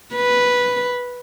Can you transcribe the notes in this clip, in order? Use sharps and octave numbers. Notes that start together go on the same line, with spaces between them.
B4